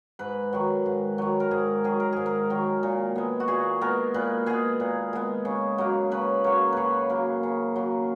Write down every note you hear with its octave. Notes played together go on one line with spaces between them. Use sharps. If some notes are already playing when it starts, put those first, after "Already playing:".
G#2 B4
D#3 F#3
G#2
D#3 F#3
A#4
G#2 G#4
D#3 F#3 G#4
A#4
G#2 G#4
A#4
D#3 F#3
A#2
G#3 B3
F#4
A#2 G#4
G#3 B3 A#4
A#2 B4
G#3 B3 G#4
A#2
G#3 B3
C#3
F#3 A#3
C#3 B4
F#3 A#3 C#5
C#3 B4 C#5
F#3 A#3
C#3
F#3 A#3